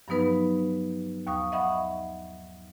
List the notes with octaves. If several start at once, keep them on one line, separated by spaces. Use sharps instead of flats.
G2 F3 F#3 B3 D#4 B4
D#2 F5 C#6 D#6
D#5 E5 F#5 B5 C#6 D#6